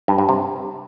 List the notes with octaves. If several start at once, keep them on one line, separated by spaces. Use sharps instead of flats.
G2
G2
C3